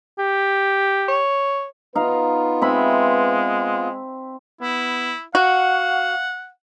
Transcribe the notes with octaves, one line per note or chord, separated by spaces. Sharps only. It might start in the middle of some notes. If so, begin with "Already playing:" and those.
G4
C#5
B3 D#4 F4 B4 F5
G#3 C4 E5 B5
B3 E4
F#4 F5 F#5